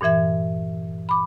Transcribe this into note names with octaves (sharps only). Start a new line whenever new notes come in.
G2 A#2 E3 E5 G#6
B5 D6